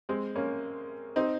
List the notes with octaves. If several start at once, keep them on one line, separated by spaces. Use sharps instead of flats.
G#3 C4
A#3 C#4
C4 D#4